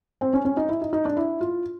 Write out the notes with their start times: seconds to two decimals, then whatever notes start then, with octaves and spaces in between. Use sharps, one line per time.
0.21 C4
0.33 C#4
0.45 C#4
0.57 D#4
0.69 E4
0.81 D#4
0.93 D#4
1.05 D4
1.17 E4
1.41 F4